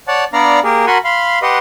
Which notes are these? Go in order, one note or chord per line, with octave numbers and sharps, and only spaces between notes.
C#5 D5 F#5 A5
B3 D4 D5 F5 A#5
A#3 G4 G#4 A#4
F#4 A#4 F#5 G#5 B5 C6
F5 B5 C6
G4 B4 D#5 F#5 C6